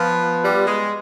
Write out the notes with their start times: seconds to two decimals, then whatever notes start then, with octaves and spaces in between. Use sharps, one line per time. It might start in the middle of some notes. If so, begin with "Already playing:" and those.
Already playing: F3 B3 F4 B4
0.43 G3
0.67 G#3